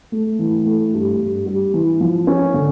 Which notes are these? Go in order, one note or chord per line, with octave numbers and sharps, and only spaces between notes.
A3
E3
A3
G2
G2
G3
E3
F3
C#4
D3